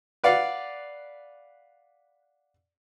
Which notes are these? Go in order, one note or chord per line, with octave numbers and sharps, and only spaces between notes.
B4 D5 F5 F#5